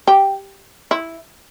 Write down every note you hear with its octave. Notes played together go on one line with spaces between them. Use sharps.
G4
E4